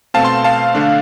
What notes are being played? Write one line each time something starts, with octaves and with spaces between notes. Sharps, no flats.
B2 A3 C4 F5 A5
A5 C6
F5 A5
D3 A3 D4